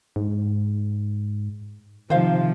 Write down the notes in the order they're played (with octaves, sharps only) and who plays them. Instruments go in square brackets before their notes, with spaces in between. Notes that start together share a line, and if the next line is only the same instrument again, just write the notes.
[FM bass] G#2
[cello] C3 F3 [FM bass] D#3 [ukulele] C5 F5